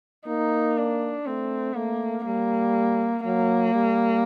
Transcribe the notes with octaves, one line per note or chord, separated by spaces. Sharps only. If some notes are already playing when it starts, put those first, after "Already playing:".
A#3 D#4
D4
A3 C4
A3 A#3
G3 A#3
F#3 A#3
G3